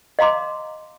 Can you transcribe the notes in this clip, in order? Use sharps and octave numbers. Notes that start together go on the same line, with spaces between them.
D#5 F5 A#5 C6 D6